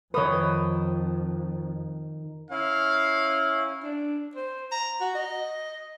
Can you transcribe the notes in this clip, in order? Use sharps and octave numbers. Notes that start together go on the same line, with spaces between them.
F2 D#3 B4 C#5 D#6
C#4 E4 F5
D4
C5
A#5
F#4
D#5